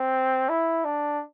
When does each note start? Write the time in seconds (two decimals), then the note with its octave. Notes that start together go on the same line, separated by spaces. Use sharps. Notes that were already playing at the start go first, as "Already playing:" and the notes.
Already playing: C4
0.49 E4
0.85 D4